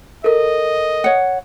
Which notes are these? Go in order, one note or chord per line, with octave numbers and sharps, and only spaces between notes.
A4 A#4 D#5
C#5 F#5